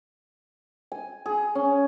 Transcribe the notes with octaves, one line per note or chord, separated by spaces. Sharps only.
G#5
G#4
C#4